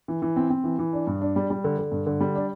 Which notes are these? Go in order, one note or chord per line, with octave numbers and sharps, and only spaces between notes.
E3
E3
C4
C4
E3
E3
D4
G2
D4
G3
G3
D3
D3
G2
D3
G3
D4